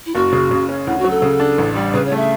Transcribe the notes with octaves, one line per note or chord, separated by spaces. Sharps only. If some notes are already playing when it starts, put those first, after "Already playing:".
E4
F#1 F#4
C#3
C#3
C#4
D2 E4
F#4
F#3
A4
C#3
D4
A1
G3
C#3 B4
C#5
A3 E5